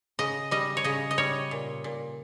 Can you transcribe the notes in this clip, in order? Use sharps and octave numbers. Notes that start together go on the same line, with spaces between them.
C#3 D#5
G3 D#5
C#5
C#3 D#5
D#5
G3 C#5
A#2
A#2